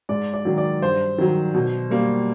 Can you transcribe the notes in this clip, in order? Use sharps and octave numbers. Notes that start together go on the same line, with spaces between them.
G#2 D5
D5
D#3 F#3
D5
G2 C5
D#3 F#3
B2
G3 A#3